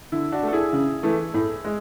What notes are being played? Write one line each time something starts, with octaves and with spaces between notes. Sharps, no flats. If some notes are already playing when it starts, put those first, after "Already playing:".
D3 E4
D4 F#4
A3
A4
E4 G#4
C#3
E3 A3
A2
G#3